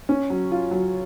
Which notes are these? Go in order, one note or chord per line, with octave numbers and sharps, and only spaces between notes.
C#4
F#3
F4
F#3